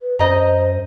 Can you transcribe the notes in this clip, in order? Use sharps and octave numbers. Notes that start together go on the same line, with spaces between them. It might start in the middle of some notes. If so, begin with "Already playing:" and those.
B4
F#2 C5 D#5 A#5